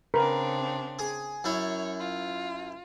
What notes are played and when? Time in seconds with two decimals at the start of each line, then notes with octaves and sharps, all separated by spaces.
0.14 C#3 C4 D4 A#4 B4
0.99 G#4
1.44 F#2 E4 C#5
1.98 F4